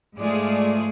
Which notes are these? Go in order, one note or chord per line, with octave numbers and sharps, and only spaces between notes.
G#2 G#3 A3 F4 G#4 D5